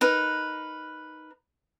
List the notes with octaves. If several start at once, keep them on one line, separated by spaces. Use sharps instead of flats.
D#4 A#4 B4